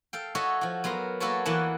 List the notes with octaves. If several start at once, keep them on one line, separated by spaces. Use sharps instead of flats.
A4 F5 G5
F#4 A4 C#5 D#5 E5
F3 F#4
F#3 B3 A#4 C6
A#3 F#4 A4 B4 C#5 A5
E2 E3 A#3 B4 F#5 A5